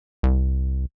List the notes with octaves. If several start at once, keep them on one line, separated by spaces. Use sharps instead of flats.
C2